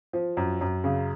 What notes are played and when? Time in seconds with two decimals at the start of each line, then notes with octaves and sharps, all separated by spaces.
0.13 F3
0.37 F#2
0.61 F#2
0.84 C#3